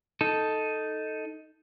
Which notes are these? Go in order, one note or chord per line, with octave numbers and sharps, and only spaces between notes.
D#4 A4